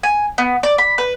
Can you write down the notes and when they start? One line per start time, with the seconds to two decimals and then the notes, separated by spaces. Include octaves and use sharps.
0.03 G#5
0.38 B3
0.63 D5
0.78 B5
0.98 B4